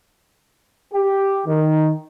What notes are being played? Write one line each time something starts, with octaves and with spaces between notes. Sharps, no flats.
G4
D#3